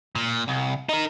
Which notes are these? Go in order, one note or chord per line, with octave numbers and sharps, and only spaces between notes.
A#2
C2
D#4 A#4